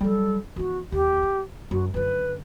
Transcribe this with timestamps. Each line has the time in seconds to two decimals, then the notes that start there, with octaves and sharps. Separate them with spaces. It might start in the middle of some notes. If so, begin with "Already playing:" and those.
0.01 F#3 G3 A4
0.56 E3 B3 F#4
0.92 D#2 A#3 G4
1.23 C4
1.71 F#2 F#4
1.94 F#2 D3 B4